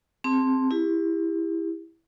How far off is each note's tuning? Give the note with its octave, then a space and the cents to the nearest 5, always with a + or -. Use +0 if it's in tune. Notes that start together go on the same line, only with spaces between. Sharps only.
C4 +0 G#4 -25 A5 +0
E4 +0 G4 +30